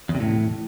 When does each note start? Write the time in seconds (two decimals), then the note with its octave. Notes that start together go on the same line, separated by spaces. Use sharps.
0.09 E2
0.15 C3
0.20 A2